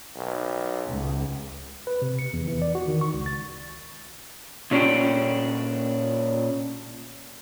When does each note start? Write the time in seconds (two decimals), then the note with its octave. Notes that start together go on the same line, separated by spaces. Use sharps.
0.16 B1
0.87 C#2
1.87 B4
2.02 C3
2.19 C#7
2.33 E2
2.48 E3
2.62 D5
2.75 F#4
2.88 D#3
3.01 C#6
3.14 C#2
3.26 A6
4.71 A#2 C#4 D4 G5